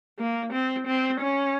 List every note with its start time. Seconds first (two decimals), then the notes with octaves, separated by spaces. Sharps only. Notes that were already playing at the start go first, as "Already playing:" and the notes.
0.19 A#3
0.52 C4
0.87 C4
1.20 C#4